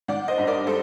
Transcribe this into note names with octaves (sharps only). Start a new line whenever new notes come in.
D#3 D5 F#5
C5 D#5
G2
A#4 D5
G3 A4 C5